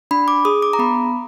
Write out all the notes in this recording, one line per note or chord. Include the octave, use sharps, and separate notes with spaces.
D4 B5
D6
G#4 D#6
D6
A#5
B3 B5